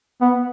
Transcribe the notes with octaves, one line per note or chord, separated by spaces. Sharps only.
B3